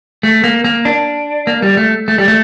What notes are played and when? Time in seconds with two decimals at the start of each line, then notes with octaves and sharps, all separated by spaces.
0.23 A3
0.44 A#3
0.64 A#3
0.85 D4
1.47 A#3
1.62 G3
1.77 A3
2.08 A3
2.18 G3
2.28 A3